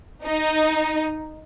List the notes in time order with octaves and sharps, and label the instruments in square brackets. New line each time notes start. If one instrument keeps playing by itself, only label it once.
[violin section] D#4